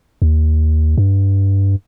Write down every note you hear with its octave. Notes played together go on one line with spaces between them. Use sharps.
D#2
G2